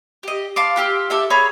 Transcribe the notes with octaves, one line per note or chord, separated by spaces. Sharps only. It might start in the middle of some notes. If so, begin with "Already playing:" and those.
G4 D#5
F5 A5 C6 D6
F4 G4 E6
G4 A4 E5
G#4 C#5 A#5 B5